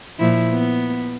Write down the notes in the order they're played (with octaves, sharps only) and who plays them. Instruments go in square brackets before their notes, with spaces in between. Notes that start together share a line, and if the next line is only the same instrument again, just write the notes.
[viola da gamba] A#2 F3 E4
B3